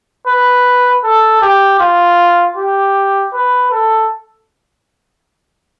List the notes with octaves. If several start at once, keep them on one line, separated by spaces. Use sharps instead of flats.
B4
A4
G4
F4
G4
B4
A4